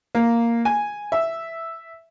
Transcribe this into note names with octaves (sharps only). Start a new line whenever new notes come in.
A#3
G#5
E5